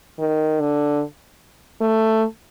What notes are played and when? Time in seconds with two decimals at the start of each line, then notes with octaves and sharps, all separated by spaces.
0.19 D#3
0.60 D3
1.81 A3